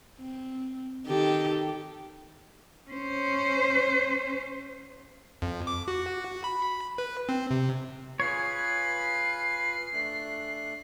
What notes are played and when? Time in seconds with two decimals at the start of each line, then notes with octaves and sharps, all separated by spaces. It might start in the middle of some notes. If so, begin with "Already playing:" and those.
0.20 C4
1.07 D#3 G4 A4
2.90 C#4 C5
5.42 F2
5.67 D6
5.88 F#4
6.44 B5
6.98 B4
7.29 C4
7.51 C3
8.20 F4 G#4 B4 C#5 B5 C7
9.93 A3 D4 F#6